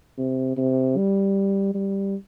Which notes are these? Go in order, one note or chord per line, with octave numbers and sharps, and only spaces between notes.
C3
C3
G3
G3